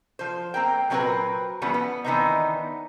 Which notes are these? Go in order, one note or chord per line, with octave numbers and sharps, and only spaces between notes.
F3 C5
A#3 C4 A#4 G5
A#2 F#3 C4 C#4 A#4 B4
E3 F3 G3 B3 C#4
B3
D#3 E3 B3 C4 D4 D#4